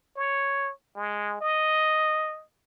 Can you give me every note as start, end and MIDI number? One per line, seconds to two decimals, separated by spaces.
0.16 0.72 73
0.96 1.36 56
1.41 2.43 75